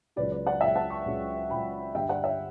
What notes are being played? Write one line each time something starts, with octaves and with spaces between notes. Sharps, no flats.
C#2 C#3 F#3 B4 D5
B4 D5
D5 F#5
C#2 C#3 F#3 E5 G5
F#5 A5
A5 C#6
C#2 C#3 F#3
C#2 C#3 F#3 G5 B5
G2 D3 G3 E5 G5
D5 F#5
C#5 E5